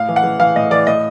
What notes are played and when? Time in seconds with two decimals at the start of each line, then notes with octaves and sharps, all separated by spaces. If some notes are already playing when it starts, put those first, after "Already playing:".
Already playing: A2 F5
0.09 E3
0.16 F#5
0.24 E3
0.39 E3 F5
0.56 A2 D#5
0.71 E3 D5
0.87 A2 D#5